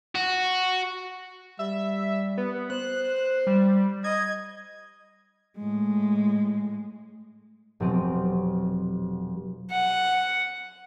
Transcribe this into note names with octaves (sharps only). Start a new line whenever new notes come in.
F#4
G3 E5
B3
C5 F#6
G3
D#5 G#6
A2 G#3
F1 B2 F#3 C4 G4 D#7
F#5